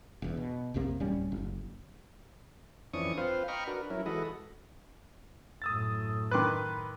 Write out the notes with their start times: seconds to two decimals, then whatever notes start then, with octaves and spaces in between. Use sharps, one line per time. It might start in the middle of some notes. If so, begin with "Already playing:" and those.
0.22 E1 E2
0.37 B2
0.74 A#1 F2 C3 A#3
1.00 D1 G3 C#4
1.32 F#1
2.94 F2 E3 C#4 D4 C#6 D#6
3.18 C4 F4 B4 C5 F5
3.48 D#5 G5 A#5 B5 C#6 F6
3.67 D4 F#4 A#4 B4
3.90 F#3 C#4 E4 A#4
4.06 E3 G#3 F#4 A4 B4 D#5
5.62 F#2 A2 D#6 E6 A6
6.31 D#3 B4 C6 D6 F#6